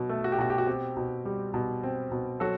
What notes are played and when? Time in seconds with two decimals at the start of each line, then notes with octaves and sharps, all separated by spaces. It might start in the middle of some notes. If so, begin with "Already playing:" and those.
Already playing: B2 F#3
0.09 A3
0.24 F#4
0.32 G4
0.39 B2 F#4
0.50 G4
0.58 F#4
0.67 C4 G4
0.97 B2
1.25 G3
1.54 B2
1.83 C4
2.12 B2
2.40 F#3 F#4 A4